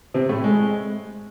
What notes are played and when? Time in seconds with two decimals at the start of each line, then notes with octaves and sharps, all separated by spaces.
0.14 C3 C4
0.29 A2 A3
0.44 G#3